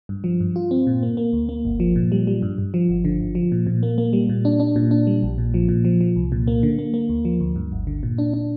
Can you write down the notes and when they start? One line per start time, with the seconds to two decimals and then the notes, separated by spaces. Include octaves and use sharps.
0.09 G2
0.24 F3
0.40 G2
0.56 F4
0.71 C4
0.87 A#2
1.03 A#3
1.17 A#3
1.33 D2
1.49 A#3
1.65 G1
1.80 F3
1.96 A#2
2.12 G3
2.27 G3
2.42 G2
2.58 G2
2.74 F3
2.89 G1
3.05 D3
3.20 G1
3.35 F3
3.52 A#2
3.67 A#2
3.83 A#3
3.98 A#3
4.13 G3
4.29 A#2
4.45 D4
4.60 D4
4.76 A#2
4.91 D4
5.07 G3
5.23 A#1
5.38 A#2
5.54 F3
5.68 A#2
5.85 F3
6.01 F3
6.16 C2
6.32 A#2
6.47 A#3
6.63 D3
6.79 A#3
6.94 A#3
7.09 D2
7.25 F3
7.40 D2
7.56 G2
7.72 G1
7.87 D3
8.03 A#2
8.18 D4
8.34 D4